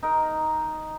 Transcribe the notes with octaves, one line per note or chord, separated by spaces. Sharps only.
D#4 A#4